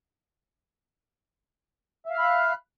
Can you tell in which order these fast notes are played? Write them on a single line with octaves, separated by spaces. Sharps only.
E5 F5 F6 B5 F#6